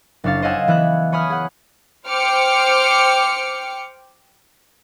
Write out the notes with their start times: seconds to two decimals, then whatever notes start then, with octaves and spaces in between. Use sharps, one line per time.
0.24 F#1 D4 C#5 F5 A6
0.42 C5 D#5 F5 F#5 G#5 E6
0.68 E3 B3 E5 F#6 G#6
1.12 C#5 G#5 B5 D#6 F6
1.30 G#4 F#5
2.08 C5 G5 D6 F6 C#7